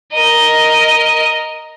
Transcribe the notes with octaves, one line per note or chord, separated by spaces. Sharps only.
A#4 D#5